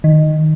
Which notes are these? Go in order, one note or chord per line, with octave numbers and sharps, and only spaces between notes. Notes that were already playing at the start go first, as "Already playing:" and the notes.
D#3